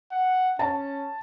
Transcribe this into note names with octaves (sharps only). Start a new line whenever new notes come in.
F#5
C#4 A5